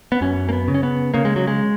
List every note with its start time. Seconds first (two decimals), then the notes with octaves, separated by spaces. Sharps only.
0.12 B3
0.21 F#2 C#4
0.49 A#3
0.52 B3
0.68 C#3
0.74 C#4
0.83 B3
1.14 C#3 A#3
1.25 G#3
1.36 F#3
1.47 G#3